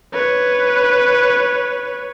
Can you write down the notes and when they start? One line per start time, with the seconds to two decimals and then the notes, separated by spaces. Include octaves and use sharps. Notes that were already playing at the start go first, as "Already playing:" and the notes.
0.13 B4 C#5